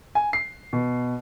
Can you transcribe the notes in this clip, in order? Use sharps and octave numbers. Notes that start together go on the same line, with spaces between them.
G#5
C7
B2